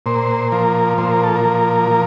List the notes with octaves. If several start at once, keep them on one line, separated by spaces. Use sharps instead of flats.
A#2 C5
F3 A#4
A#2 C5
A#4
A4
A#4
F3
F3